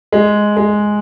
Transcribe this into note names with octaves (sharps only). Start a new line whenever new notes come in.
G#3
G#3